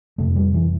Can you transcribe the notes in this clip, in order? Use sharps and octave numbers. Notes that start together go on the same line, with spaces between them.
F2 C3 A3
G3
E3